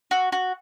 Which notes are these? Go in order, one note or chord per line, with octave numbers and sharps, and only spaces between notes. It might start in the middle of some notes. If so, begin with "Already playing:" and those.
F#4
F#4